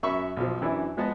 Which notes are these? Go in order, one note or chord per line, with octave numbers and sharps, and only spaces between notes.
F#2 E5 B5 C#6
B1 F3
F#2 E3 D4 E4
F3 G#3 B3 D#5 A5